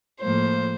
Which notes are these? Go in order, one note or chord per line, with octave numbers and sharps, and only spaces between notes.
A2 F3 A#3 C5